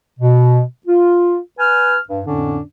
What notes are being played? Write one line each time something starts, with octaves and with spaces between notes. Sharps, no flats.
B2
F4
B4 G#5 F6
G2
F2 A2 D3 C#4 D4